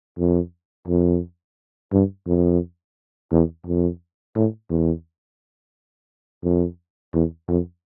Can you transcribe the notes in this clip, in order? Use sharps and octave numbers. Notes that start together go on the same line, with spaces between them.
F2
F2
G2
F2
E2
F2
A2
E2
F2
E2
F2